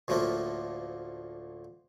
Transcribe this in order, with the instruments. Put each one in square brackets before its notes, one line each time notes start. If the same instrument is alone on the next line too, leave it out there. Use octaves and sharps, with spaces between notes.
[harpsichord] D2 A2 F3 A3 A#3